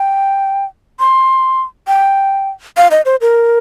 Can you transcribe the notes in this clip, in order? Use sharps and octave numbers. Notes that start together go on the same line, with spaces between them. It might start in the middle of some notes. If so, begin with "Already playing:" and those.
Already playing: G5
C6
G5
F5
D#5
C5
A#4